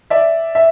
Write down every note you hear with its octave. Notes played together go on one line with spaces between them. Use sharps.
D5 E5
E5